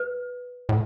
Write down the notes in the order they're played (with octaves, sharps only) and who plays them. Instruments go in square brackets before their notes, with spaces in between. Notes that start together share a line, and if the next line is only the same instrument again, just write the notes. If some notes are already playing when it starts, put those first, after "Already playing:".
Already playing: [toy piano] B4
[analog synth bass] A2